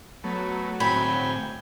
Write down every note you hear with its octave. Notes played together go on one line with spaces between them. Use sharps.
F#3 A3 B3
A2 C4 G5 G#5 B5